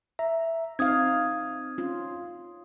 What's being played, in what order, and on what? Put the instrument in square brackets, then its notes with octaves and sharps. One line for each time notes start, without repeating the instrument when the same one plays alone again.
[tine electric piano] E5 [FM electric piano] A#5
[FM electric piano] C4 [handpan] D#4 F5 [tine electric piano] D#6 G#6
[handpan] C#4 F4